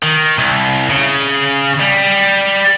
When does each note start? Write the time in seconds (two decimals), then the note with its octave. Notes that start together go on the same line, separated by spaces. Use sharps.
0.03 D#3
0.39 C2
0.90 C#3
1.80 G3